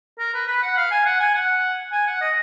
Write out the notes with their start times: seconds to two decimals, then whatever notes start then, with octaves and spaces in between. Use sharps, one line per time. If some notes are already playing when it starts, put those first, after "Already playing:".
0.19 A#4
0.34 B4
0.48 B4
0.63 F#5
0.77 F5
0.91 G#5
1.06 F#5
1.20 G#5
1.35 F#5
1.93 G#5
2.07 F#5
2.21 D#5